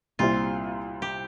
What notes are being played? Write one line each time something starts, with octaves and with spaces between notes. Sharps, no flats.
C2 A#2 G3 C4 E4 F4
G4